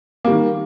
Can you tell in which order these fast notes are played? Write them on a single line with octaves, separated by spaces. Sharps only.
A#3 G3 D#3